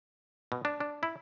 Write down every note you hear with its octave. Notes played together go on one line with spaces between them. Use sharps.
B2
D4
D4
E4